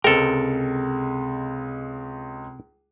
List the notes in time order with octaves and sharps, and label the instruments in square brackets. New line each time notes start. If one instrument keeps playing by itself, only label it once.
[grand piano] C#2 G#3 [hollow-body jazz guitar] C3 G5 [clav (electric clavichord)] A4 A#4